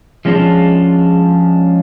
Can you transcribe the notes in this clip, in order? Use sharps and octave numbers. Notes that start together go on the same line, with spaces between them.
F3 G#3 C#4 D4 F4